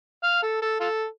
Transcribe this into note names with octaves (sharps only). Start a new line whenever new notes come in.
F5
A4
A4
F4 A4